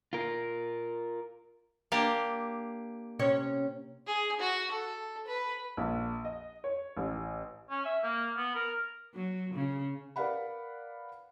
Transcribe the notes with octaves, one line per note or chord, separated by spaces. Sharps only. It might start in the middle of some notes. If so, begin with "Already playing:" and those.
F4 A#4
A#3 D4 G4
C3 C#4 C#5
G#4
F#4
A4
B4
A#1
D#5
C#5
A1
C#4
E5
A#3
B3
A#4
F#3
C#3
A#4 B4 D5 F5 F#5 B5